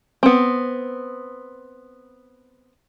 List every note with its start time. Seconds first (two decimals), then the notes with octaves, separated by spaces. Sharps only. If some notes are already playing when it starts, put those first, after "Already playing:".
0.23 B3 C4